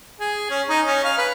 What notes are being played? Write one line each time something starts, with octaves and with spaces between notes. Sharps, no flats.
G#4
C#4
D#4
C#4
F5
B4